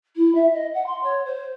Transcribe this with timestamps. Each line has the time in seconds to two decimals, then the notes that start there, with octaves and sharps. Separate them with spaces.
0.16 E4
0.35 E5
0.54 D#5
0.74 F#5
0.86 C6
1.03 C#5
1.25 C5